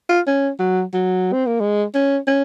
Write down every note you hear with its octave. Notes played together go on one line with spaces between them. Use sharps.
F4
C#4
F#3
F#3
C4
A#3
G#3
C#4
C#4